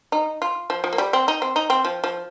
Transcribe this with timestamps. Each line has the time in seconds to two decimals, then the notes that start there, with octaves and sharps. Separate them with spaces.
0.12 D#4
0.42 F4
0.70 F3
0.84 F3
0.93 A#3
0.98 G3
1.13 C4
1.28 D#4
1.42 C4
1.56 D#4
1.70 C4
1.85 F3
2.04 F3